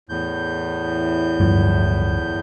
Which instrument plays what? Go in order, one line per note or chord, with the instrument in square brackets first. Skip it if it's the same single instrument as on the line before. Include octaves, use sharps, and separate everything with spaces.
[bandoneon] E2 A2 G6
[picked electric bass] D1 G2 F3